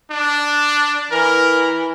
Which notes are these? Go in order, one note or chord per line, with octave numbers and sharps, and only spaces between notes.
D4
E3 A#4